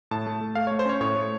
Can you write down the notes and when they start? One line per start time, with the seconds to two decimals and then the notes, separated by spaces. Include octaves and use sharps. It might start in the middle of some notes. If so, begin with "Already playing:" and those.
0.11 A2 A5
0.27 A3
0.41 A3
0.55 A3 F5
0.67 A3 C#5
0.79 C5
0.86 C#4 C#5
1.01 A2 C#5
1.16 A3